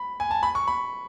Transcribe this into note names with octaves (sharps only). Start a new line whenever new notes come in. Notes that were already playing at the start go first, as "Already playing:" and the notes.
Already playing: B5
G#5
A5
B5
C#6
B5